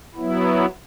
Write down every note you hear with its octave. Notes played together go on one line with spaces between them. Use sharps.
F#3 B3 E4